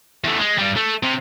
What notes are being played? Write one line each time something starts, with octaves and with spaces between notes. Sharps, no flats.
E2 A3
G#3
G2 G3
A3
C3